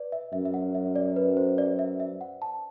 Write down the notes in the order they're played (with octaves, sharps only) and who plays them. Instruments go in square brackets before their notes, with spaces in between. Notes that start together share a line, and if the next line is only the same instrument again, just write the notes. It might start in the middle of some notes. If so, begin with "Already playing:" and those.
Already playing: [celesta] B4 D5
E5
[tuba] F#2 [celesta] E5
[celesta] E5
F#5
E5
D5
B4
C5
D5
E5
E5
F#5
A5